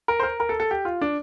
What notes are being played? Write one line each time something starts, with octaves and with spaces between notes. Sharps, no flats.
A#4
C5
A#4
A#4
A4
A4
G4
F4
D4